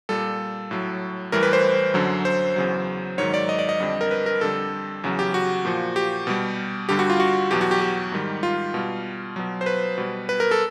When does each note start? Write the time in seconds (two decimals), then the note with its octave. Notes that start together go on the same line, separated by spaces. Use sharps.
0.09 A#2 G3 A4
0.71 A2 F#3
1.32 A2 E3 G3 A#4
1.43 B4
1.53 C5
1.94 F#2 D3 F#3
2.25 C5
2.56 E2 C#3 F#3
3.18 G#2 D#3 F#3 C#5
3.34 D5
3.49 D#5
3.59 D5
3.69 D#5
3.80 F2 D3 G3
4.01 A#4
4.11 B4
4.26 A#4
4.41 F2 D3 G3 A4
5.04 E2 C#3 F#3
5.19 G4
5.34 F#4
5.65 A#2 F3
5.96 G4
6.27 B2 G3
6.89 G2 D3 G3 G4
6.99 F#4
7.10 F4
7.20 F#4
7.51 E2 B2 F#3 G4
7.61 F#4
7.71 G4
7.81 G4
8.12 G#2 D#3 G3
8.43 F4
8.74 B2 G3
9.36 B2 F#3
9.61 C5
9.66 B4
9.98 B2 G3
10.29 B4
10.40 A#4
10.51 A4